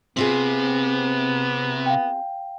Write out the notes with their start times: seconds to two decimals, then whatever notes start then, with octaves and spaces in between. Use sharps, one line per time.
0.17 C3 B3 C4 F4 G#4
1.86 F5 G5